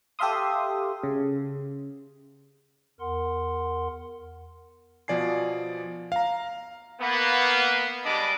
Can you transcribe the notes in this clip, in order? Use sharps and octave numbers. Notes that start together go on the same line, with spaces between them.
G4 A4 E5 F5 C6 D#6
C#3
E2 A#4 F#5 C6
B2 F3 D5 G#5 C7
F5 A#5
A#3 B3
G3 G#3 D4 D#5 B5 D6